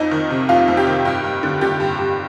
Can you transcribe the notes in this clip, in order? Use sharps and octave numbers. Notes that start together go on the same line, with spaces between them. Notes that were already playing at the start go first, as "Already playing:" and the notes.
Already playing: F2 D#4
D#3
C3
F2 F4
F2
G4
D#3
G2 G4
G2
D3
D3 G4
G2
G2